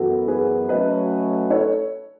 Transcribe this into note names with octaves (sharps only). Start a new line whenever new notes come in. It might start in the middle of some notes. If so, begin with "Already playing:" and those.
Already playing: F#2 E3 B3 F#4 A4
G#4 B4
F#3 A3 C#4 B4 D#5
A4 C#5